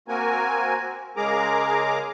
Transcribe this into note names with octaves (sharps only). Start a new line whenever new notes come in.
A#3 C4 F#4 A#4 G#5
C#3 G#3 G#4 A#4 A#5 D6